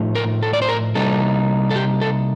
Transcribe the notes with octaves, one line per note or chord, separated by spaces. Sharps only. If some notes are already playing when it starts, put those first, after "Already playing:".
Already playing: A2 F3 A3 D#4
A#4
A4
D5
C5
A#4
C3 G3 A#3 D#4 A4
A4
G4
A4